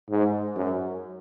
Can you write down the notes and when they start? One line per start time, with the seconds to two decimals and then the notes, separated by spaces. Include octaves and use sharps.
0.10 G#2
0.56 F#2